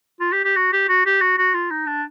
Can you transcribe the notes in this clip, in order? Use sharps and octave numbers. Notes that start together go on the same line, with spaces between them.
F4
G4
G4
F#4
G4
F#4
G4
F#4
F#4
F4
D#4
D4